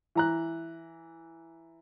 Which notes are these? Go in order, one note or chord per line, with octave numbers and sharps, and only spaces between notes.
E3 A#5 F#6